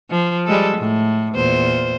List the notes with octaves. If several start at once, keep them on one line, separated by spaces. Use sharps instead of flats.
F3
G3 G#3 A4
A2
E2 A#2 C5